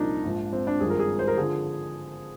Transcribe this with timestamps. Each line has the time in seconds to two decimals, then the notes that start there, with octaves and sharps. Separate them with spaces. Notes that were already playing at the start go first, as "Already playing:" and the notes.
Already playing: C2 A#2 F3 D4 D#4
0.24 A#1 G#2 F3
0.53 C4
0.67 D4
0.80 G#1 G2 F3 G#4
0.90 A#4
0.99 G#4
1.19 C5
1.28 A#4
1.37 D3 F3 G#4